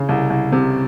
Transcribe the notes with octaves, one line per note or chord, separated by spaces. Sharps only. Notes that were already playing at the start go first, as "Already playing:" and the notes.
Already playing: C#3
C2
C2
C3